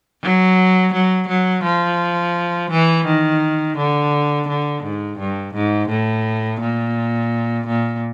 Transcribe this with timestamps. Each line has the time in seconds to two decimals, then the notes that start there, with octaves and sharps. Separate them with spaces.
0.23 F#3
0.93 F#3
1.28 F#3
1.64 F3
2.71 E3
3.06 D#3
3.77 D3
4.48 D3
4.83 G#2
5.19 G2
5.54 G#2
5.89 A2
6.60 A#2
7.67 A#2